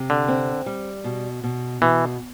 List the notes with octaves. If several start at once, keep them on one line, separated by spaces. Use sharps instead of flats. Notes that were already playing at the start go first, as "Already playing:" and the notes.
Already playing: C3
D3
C4
G3
B2
B2
B2 E3